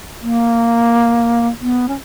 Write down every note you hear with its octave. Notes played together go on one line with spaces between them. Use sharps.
A#3
B3
C#4